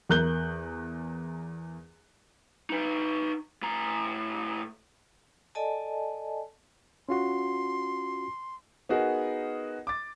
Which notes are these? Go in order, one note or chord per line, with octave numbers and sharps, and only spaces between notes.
E2 A#4 F#6 G6 G7
D#4 B4
A2 A#5
A4 D5 D#5 G#5 A5
C#4 F4 F#4 C6
B3 D#4 F#4 G#4 A#4
D6 A6